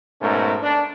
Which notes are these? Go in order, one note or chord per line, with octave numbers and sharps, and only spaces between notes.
G#2 B2 A3 C#4 A#4
D4